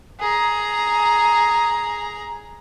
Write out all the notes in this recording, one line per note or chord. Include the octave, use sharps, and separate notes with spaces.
G#4 A#5